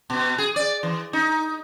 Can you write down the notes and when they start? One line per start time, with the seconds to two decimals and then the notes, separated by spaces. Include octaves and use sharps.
0.10 B2
0.38 G#4
0.56 D5
0.83 E3
1.13 D#4